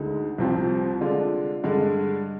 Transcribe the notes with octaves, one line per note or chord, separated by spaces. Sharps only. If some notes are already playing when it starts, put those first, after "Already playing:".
Already playing: D2 D3 G#3 D#4
C2 C3 F3 C4
D3 G#3 D4 F4
G2 D3 G#3